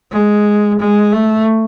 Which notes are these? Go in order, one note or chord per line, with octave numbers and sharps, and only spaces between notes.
G#3
G#3
A3